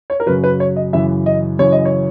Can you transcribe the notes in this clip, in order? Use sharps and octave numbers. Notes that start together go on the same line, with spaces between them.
C#5
A#4
F#2 C#3 F#3 B4
B4
C#5
D#5
F#2 C#3 E3 E5
D#5
F#2 C#3 E3 C#5
D#5
C#5